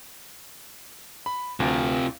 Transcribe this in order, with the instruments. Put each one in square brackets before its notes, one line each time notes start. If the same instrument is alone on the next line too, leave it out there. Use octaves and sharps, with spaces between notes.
[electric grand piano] B5
[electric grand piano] D2 [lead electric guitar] C3 F4